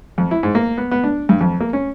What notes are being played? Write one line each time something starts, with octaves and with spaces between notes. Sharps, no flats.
F2
E4
G#2
A#3
B3
B3
D4
G2
F2
A#3
C#4